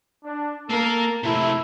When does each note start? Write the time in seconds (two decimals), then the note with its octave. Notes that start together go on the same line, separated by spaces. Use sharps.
0.24 D4
0.70 A#3 A4 A#4 F5
1.23 C3 A3 E4